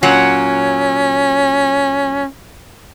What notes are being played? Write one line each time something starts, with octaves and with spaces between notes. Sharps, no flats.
A#2 F#3 C#4 F#5